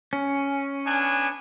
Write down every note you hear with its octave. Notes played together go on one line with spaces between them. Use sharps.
C#4
B3 D4 G#5